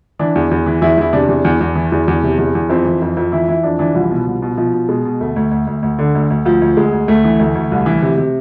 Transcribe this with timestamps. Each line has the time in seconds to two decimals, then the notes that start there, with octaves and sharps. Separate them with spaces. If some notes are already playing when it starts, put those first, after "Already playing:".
0.19 E3 D4
0.36 E2
0.51 E2
0.66 E3
0.82 E2 E4
0.98 E2 E4
1.13 C3 D4
1.28 E2
1.45 E2
1.61 E2
1.75 E3
1.92 E2
2.08 E2
2.23 C3
2.38 E2
2.55 E2
2.69 F2 C4
2.85 E3
3.01 F2
3.17 F2
3.32 E3 E4
3.48 E3 E4
3.63 F2 D4
3.79 E3 D4
3.95 C2 F3
4.11 B2
4.27 C2
4.42 B2
4.57 B2 F3
4.74 B2
4.89 B2 G#3
5.05 B2
5.20 D2 A3
5.36 D2
5.51 D2
5.67 D2
5.82 D2
5.99 D3
6.15 D2
6.30 D2
6.45 D2 F3
6.61 D2
6.77 D2 G#3
6.92 D2
7.08 D2 A3
7.24 E3
7.39 D2 A3
7.55 D2
7.72 C2
7.86 E3
8.02 C3
8.17 C3